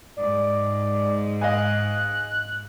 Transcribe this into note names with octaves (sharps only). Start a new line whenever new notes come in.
G#2 D5
D#5 F5 G#5 F#6